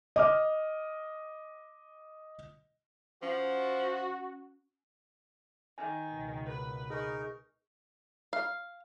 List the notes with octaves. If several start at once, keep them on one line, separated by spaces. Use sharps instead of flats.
D#5 D6 F6
F3 C#4 F#4
D#3 G#5
C#2 B2
A#4 B4
D#4 G#4 A#4 C#6
F5